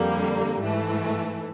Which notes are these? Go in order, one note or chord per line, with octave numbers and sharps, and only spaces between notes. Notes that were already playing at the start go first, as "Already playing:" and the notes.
Already playing: F2 D3 G3 A#3
G#2 E3 A3